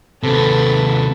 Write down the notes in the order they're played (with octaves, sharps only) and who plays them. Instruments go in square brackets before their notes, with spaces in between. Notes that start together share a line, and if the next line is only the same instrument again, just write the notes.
[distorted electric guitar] D#2 C3 [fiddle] A4 B4